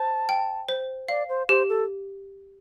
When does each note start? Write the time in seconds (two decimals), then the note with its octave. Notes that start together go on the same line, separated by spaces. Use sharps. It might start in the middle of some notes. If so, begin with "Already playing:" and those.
Already playing: C5 A5
0.29 G5
0.69 C5
1.08 D5 F5
1.29 C5
1.49 G4 C5
1.69 A4